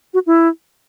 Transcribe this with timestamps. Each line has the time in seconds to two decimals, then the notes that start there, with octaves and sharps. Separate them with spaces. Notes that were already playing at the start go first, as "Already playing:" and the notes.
0.14 F#4
0.27 E4